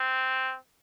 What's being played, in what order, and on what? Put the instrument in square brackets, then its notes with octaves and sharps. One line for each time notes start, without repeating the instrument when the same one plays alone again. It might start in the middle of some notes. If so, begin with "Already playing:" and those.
Already playing: [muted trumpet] C4